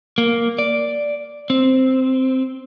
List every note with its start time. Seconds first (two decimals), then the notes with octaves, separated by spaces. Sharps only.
0.18 A#3
0.59 D5
1.50 C4